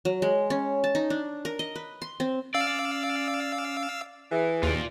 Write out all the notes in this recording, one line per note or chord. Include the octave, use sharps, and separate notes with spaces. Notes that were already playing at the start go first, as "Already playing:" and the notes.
F#3
G#3
C#4
A5
D#4
D4
A#4
D#5
B4
C6
C4
C#4 D5 F5 E6
E3 G#4
D#2 F4 D5